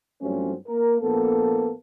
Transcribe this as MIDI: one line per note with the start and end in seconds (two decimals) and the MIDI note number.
0.22 0.54 43
0.22 0.54 53
0.22 0.54 54
0.22 0.54 57
0.22 0.54 60
0.22 0.54 61
0.68 0.96 58
0.68 0.96 70
1.01 1.71 34
1.01 1.71 58
1.01 1.71 59
1.01 1.71 69